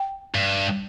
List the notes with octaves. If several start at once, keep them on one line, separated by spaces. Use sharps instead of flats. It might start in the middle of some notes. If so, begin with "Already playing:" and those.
Already playing: G5
G2